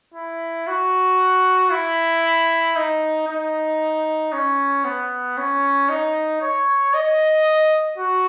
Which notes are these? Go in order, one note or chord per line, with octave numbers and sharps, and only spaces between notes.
E4
F#4
E4
D#4
D#4
C#4
B3
C#4
D#4
C#5
D#5
F#4